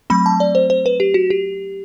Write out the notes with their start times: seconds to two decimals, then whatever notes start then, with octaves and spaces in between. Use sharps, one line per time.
0.10 F#3 A3 C4 B5
0.26 A5
0.40 D5
0.55 C5
0.70 C5
0.86 B4
1.00 G4
1.14 F#4
1.30 G4